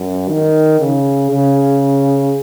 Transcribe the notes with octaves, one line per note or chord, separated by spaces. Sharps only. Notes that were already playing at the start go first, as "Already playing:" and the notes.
Already playing: F#2
D#3
C#3
C#3